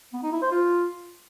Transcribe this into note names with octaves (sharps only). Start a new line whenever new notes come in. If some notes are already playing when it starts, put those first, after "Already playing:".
B3
D#4
E4
C5
F4